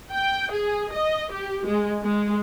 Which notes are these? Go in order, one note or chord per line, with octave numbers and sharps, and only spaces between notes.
G5
G#4
D#5
G4
G#3
G#3